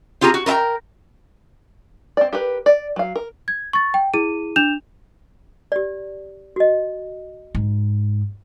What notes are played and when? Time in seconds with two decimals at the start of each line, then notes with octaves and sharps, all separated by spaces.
0.21 C4 F4 G4 G#4 A#5
0.34 F#4
0.46 A#4 B4 E5 G5 A#5
2.17 C4 D5
2.33 G4 A#4 B4
2.66 D5
2.96 F#3 F5
3.15 A#4
3.48 G#6
3.73 C#6 A6
3.94 G5
4.14 E4 G#4 D#7
4.56 D4 G6 E7 F7
5.72 G4 D5
6.56 F#4 D#5
7.55 G#2